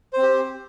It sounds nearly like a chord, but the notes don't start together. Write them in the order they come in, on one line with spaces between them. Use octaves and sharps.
C5 C4 G4